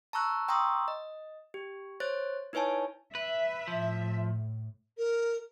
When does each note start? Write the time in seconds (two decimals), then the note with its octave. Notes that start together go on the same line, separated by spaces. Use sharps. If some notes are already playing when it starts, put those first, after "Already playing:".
0.13 A5 A#5 C#6 E6 F#6
0.48 G5 A#5 C6 C#6 D#6 E6
0.88 D#5
1.54 G4
2.00 C5 C#5 F#6 A6
2.53 D#4 E4 B4 C#5 G#5 A5
3.15 B4 E5
3.68 A2 F3
4.98 A#4